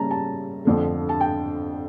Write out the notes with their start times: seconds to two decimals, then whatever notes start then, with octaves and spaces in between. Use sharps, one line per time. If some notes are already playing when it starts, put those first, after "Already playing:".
Already playing: C#3 G3 A#3 C#4 A5 A#5
0.11 A5
0.65 F2 D3 F3 A3
1.09 A5
1.21 G5